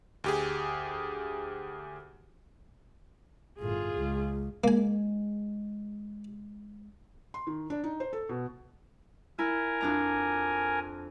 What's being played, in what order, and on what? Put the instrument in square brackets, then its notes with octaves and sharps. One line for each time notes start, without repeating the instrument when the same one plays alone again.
[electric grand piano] D2 G4 G#4
[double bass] G1 A2 [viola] F4 G#4
[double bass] C#2
[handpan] G#3 [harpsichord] A#3 G#5
[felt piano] C6
D#3
D4
D#4
C5
A4
B2
[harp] E4 [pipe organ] A#4 G#5
[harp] F2 D4 A#5